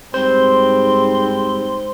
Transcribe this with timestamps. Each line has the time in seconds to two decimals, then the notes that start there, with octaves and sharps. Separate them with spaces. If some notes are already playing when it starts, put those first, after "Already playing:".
0.14 G#2 G3 C4 C5 C6